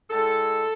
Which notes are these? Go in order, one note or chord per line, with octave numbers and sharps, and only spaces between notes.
A2 G#3 A4